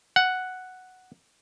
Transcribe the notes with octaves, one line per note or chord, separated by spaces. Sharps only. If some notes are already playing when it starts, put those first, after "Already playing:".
F#5